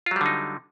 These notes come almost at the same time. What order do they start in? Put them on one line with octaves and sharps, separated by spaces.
F4 F#3 G3 D3 D#4